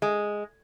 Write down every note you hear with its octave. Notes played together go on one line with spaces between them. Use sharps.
G#3